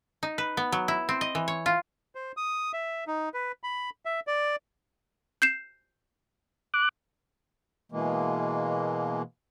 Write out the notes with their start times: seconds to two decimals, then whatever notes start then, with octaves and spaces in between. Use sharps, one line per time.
0.23 D#4
0.38 B4
0.57 B3
0.72 F#3
0.88 E4
1.09 C4
1.21 D#5
1.35 E3
1.48 C#5
1.66 F4
2.15 C5
2.37 D#6
2.73 E5
3.07 D#4
3.34 B4
3.63 B5
4.05 E5
4.27 D5
5.42 G6 C7 E7
6.74 D6 F#6
7.92 B2 E3 G#3 A#3